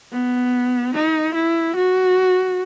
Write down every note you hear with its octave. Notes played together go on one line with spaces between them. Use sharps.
B3
D#4
E4
F#4